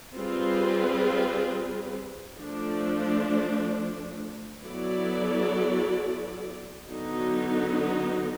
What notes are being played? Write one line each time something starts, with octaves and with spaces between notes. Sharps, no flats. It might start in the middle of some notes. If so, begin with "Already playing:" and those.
G3 C4 F4 G#4 B4
F3 A3 D4
F#3 B3 E4 A4 D5
D3 F#3 B3 D#4